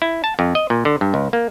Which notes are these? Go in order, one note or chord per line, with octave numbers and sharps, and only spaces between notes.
E4
A5
F2
D#5
A#2
D3
G2
C#2
A#3